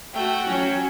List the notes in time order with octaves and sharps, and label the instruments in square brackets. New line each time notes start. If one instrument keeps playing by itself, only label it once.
[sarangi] A3 [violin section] F#4 G5
[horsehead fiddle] F#3 C#5 [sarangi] C#4